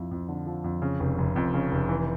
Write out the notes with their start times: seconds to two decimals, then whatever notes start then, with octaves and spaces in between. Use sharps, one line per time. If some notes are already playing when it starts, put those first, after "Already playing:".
Already playing: F2 F3 E4
0.11 F2
0.29 D3
0.47 F3
0.64 F2
0.82 C#3
1.00 F1
1.18 F1
1.36 F2
1.54 C#3
1.71 F1
1.89 E3